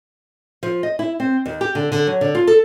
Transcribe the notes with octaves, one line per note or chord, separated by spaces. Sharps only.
F3
D#5
E4
C4
D#2
G4
D3
D3
F#3
D3
F4
A4